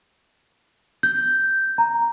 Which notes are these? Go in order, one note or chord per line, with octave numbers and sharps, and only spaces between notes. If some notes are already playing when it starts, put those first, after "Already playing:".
G6
A#5